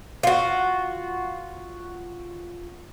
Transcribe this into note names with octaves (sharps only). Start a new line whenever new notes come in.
F4 F#4